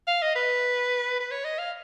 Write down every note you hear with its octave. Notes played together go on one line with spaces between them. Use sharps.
F5
D#5
B4
B4
C#5
D#5
F5